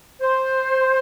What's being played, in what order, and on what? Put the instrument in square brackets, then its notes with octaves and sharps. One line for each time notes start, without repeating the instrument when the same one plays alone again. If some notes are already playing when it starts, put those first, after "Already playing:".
[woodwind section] C5